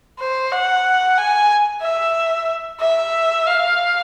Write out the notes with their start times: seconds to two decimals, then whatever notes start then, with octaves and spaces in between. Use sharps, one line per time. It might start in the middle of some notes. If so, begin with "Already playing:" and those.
0.19 C5
0.52 F#5
1.18 G#5
1.82 E5
2.80 E5
3.46 F5